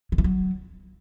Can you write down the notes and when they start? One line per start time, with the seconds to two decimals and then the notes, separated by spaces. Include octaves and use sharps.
0.12 D#3
0.18 E3
0.24 F#3